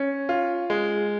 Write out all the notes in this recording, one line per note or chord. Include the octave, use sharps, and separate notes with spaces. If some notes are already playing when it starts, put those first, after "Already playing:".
Already playing: C#4
F4
G#3